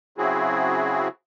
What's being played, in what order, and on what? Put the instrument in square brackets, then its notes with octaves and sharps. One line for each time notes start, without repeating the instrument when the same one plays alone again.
[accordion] C#3 F#3 C4 E4 F#4 G#4